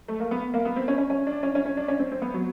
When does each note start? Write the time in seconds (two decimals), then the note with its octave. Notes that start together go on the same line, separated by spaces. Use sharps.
0.08 A3
0.20 A#3
0.31 B3
0.54 A#3
0.65 B3
0.76 C4
0.88 C#4
0.98 C#4
1.10 C#4
1.27 D4
1.43 C#4
1.55 C#4
1.66 C#4
1.77 D4
1.88 C#4
1.99 C4
2.12 C4
2.22 B3
2.34 F#3